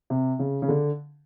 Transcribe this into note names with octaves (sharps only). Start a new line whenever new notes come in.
C3
C#3
C#3
D3